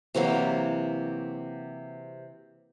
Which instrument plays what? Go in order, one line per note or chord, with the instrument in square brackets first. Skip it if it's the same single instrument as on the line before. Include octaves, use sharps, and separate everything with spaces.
[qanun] C3 E3 F#3 A#3